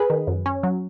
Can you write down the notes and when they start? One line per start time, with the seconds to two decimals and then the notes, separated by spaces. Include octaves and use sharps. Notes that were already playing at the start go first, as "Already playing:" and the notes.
Already playing: G#4 B4
0.10 D#3
0.27 F#2
0.46 C#4
0.63 F#3